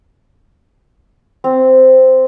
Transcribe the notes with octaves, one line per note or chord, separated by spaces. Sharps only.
C4